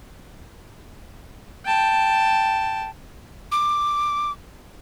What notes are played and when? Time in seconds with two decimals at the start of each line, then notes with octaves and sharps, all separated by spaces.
1.66 G5 A5
3.52 D6